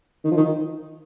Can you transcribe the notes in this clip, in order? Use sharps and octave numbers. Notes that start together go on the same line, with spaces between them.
D#3
F3
D#3